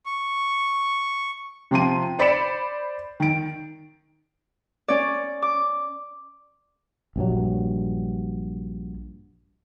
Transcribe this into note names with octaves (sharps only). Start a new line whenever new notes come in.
C#6
C3 F3 C6 D#7
C5 D5 B5 B6 C#7 E7
D#3 D7
C#4 D5
D6
A#1 G2 F#3